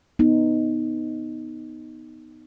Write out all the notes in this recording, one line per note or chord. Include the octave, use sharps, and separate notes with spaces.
B3 D#4